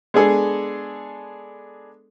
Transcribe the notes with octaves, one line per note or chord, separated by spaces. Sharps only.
G#3 B3 D4 G#4 A4